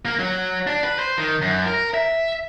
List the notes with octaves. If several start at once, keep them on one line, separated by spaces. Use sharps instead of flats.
A#3
F#3
D4
B4
C5
D#3
F#2
A#4
E5